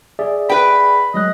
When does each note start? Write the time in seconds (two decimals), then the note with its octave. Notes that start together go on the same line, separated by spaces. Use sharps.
0.19 G#4 D5 E5
0.49 B4 G5 B5
1.14 F#3 G#3 D#5 F#6